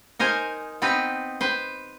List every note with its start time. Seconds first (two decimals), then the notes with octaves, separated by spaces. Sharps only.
0.19 D#4 A#4 C5 G#5
0.82 B3 C4 D#4 B4
1.41 B4 C5